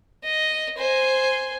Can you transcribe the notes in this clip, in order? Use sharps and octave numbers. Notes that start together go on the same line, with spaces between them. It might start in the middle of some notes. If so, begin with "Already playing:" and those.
D#5
C5 G#5